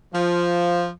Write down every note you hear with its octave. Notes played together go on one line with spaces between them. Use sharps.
F3